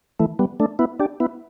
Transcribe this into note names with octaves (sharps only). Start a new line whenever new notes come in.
E3 A3
G3 B3
A3 D4
B3 E4
D4 G4
B3 E4